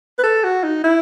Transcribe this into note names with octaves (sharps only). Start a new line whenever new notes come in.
B4
A4
F#4
D#4
E4